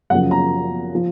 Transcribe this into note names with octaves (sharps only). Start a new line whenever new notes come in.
F#2 C#3 F3 F#5
A#5
F3